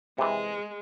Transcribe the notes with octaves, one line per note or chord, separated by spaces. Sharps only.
C3 E3 G#3